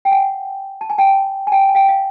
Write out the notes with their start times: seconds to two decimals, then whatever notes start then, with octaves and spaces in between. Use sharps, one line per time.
0.05 G5
0.12 F#5 G#5
0.81 A5
0.90 G#5
0.98 G5 A5
1.47 G#5
1.52 G5 A5
1.69 G#5
1.75 F5 G5
1.89 F5